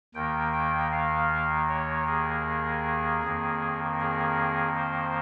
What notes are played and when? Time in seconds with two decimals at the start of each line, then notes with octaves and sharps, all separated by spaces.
0.14 D#2 D#3 A#3 G5
0.53 G5
0.92 F5
1.69 C#5
2.07 G#4
3.23 F2 D#3 A#3
4.00 G#4
4.76 C5